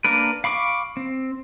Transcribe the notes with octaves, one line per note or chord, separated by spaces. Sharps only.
A#3 D4 A#4 B4
F5 B5 C#6 D6
C4